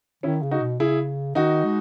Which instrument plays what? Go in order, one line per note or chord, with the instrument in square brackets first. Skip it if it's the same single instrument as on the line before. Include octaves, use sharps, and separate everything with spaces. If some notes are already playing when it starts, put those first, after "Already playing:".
[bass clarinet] D#3 [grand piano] C#4 E4
[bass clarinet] C#3
[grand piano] D#4 F#4
[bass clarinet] B2
[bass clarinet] C#3 [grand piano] E4 G#4
[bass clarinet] D#3 [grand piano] D#4 F#4
[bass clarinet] G#3